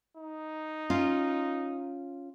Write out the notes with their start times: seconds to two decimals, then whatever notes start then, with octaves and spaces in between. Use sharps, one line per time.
0.17 D#4
0.90 C#4 F4